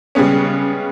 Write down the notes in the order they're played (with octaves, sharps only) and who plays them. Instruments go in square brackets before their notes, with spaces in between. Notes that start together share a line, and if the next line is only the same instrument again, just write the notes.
[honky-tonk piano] C#3 G3 G#3 B3 C#4